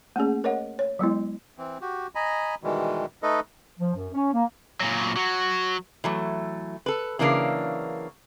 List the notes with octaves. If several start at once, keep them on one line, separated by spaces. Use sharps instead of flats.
A3 A#3 C#4 G#4
A#4 C#5 D#5 F#5
C#5
F#3 G#3 B3 E4
E3 C4
F#4 G4
D#5 G#5 A#5 B5
B2 D#3 E3 G3 G#3
A3 D#4 A4 B4 D#5
F3
F#2
C#4
A#3
A#2 F#3
F#3
E3 F#3 A3
A4 B4
C#3 E3 F#3 A#3 D4 A#4